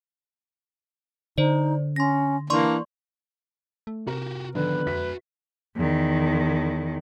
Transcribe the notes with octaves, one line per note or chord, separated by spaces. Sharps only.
D3 D#4 C5 D5
C#4 C6 A#6
E3 A#3 D4 D5 C6 C#6
A3
C3 F#4 G4 A#4
D3 D#3 F3 B3 B4
F2 F#4 E5 B6
E2 D#3